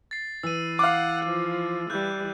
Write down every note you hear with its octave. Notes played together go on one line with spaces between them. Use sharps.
A6 C7
E3 E6 D#7
F5 F#5 D6
F3
E3 G3 F#6 G6